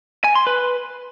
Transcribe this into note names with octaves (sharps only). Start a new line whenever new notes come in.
G#5
C6
B4